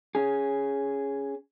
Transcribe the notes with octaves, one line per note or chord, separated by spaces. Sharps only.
C#4 G#4